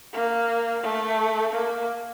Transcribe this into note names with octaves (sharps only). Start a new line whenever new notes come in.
A#3
A3
A#3